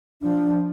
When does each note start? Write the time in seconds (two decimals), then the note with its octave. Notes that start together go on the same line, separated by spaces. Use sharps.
0.21 F3 D4